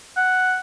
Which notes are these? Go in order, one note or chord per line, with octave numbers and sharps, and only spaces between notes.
F#5